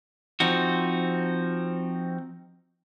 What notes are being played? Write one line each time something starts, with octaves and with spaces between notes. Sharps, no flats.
F3 C4 D#4 F#4